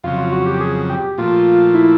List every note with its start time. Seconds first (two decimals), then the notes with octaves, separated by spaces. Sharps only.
0.04 F2 C#3 F#3 F4
0.18 F4
0.32 F#4
0.46 G4
0.61 G#4
0.90 G4
1.18 A#2 F3 A3 F4
1.74 E4